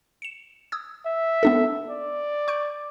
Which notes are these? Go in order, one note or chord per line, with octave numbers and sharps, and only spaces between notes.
C#7 E7
D#6 E6 G#6
E5
B3 D4 A4
D5
C#6 G6 D7